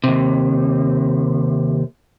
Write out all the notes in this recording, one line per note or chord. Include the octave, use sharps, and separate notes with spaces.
D#2 C3